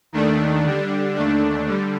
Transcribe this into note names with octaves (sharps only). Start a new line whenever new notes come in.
D#2 D#3 A3 D4
D3 G3 D4
D#2 D3 A3 D4
D3 G3